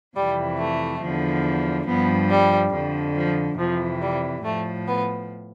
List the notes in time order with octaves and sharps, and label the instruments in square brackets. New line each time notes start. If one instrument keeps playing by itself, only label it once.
[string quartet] F2 C3 E3 G3
A3
E2 D3 F3
G2 F3 B3
G3
F2 D3 F3
F3
F2 C3 E3 F3
G3
A2 F3 A3
B3